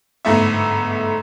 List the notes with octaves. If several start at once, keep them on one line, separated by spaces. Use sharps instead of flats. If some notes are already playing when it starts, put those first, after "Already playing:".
G1 G#2 A3 B3 E5